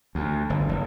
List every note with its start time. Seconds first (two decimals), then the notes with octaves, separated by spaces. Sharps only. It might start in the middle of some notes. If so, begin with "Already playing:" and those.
0.15 D2
0.50 G1
0.69 F#1